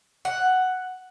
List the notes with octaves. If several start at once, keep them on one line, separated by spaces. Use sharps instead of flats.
F#5